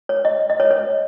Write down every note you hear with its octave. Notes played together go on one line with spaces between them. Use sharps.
C#5
D#5
D#5
C#5
C#5